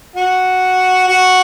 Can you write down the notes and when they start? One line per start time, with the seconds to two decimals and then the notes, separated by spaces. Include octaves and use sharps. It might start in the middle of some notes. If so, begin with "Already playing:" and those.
0.16 F#4
1.08 F#4